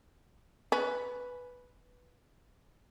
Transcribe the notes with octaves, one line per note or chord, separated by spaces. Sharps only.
C#4 B4